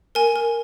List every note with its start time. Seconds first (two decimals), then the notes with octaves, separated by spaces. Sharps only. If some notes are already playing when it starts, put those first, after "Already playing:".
0.15 A#4 G#5
0.36 A#4